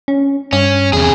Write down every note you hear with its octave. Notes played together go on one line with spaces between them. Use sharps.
C#4
G2 C#4
E2 C3 G#4